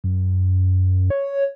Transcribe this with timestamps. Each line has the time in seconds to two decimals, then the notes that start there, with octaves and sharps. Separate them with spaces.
0.04 F#2
1.10 C#5